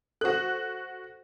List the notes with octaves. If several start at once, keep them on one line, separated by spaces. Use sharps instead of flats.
F#4 A4 C5 F#6